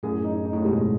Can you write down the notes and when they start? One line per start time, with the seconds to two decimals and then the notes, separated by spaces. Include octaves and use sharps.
0.03 F#2 A2 G#4
0.24 D#4
0.45 D#4
0.53 A2
0.65 G#2 B2 G#3